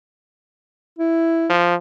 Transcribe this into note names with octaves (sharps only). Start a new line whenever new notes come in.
E4
F3